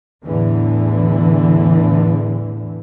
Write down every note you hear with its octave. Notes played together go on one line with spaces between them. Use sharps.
E2 A2 D3 E3